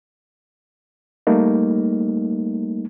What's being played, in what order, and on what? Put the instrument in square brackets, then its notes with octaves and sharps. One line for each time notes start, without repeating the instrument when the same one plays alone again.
[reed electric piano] G3 A3 A#3 D#4